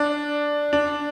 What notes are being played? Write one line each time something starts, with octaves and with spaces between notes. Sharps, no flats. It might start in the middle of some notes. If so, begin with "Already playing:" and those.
Already playing: D4
D4